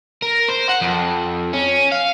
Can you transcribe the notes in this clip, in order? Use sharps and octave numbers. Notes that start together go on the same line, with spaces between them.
A#4
C5
F#5
F2
C#4
F5